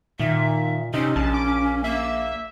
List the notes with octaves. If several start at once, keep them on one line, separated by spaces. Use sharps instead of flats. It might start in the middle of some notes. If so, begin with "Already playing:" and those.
A#2 D#3 E5
C3 C#4 D#4
A#1 A5
D6
A#3 E5